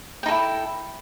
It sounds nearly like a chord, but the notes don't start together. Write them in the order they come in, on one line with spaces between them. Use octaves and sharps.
G5 D#4 A4 E4